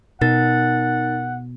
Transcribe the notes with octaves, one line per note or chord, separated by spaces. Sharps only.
B2 D#4 A#4 F#5 A6